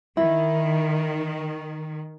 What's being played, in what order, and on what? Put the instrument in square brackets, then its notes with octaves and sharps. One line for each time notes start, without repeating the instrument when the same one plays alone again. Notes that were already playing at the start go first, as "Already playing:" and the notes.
[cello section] D#3 [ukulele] E4